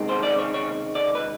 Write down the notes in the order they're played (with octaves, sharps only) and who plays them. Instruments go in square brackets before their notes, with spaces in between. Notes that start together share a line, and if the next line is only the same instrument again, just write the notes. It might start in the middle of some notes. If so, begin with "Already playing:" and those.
Already playing: [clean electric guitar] C#2 C3 D#3 G#3 C4
C5
D5
C#5
C#5
D5
B4